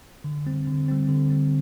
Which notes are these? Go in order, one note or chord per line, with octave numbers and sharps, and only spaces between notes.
D3
G3 C4
D3
G3 C4
D3
G3 C4